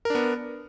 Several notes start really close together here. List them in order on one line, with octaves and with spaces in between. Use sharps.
A#4 D4 B3